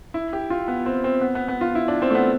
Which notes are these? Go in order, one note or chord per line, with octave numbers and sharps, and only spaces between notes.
E4
G4
F4
B3
C4
C4
B3
B3
B3
F4
E4
D4
C4
A3
B3